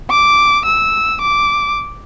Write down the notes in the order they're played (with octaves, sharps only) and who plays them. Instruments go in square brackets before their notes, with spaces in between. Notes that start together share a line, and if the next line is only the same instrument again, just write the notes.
[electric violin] D6
E6
D6